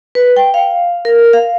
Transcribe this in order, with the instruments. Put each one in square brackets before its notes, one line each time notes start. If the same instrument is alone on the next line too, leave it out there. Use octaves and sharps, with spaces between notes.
[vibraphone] B4
G5
F5
A#4
F5